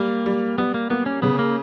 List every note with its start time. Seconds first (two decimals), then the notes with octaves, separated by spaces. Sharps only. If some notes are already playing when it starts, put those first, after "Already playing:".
Already playing: G3 A#3
0.26 G3
0.58 G3 B3
0.74 A#3
0.90 A#3 B3
1.06 C#4
1.22 C#3 B3
1.39 A#3